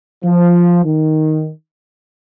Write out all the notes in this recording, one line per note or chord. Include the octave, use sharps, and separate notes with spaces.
F3
D#3